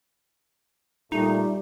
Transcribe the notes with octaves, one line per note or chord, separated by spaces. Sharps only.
A#2 G3 A3 D#4 G4